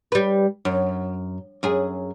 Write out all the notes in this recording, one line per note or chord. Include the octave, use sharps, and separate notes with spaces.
G3 B4
F#2
F#2 G#4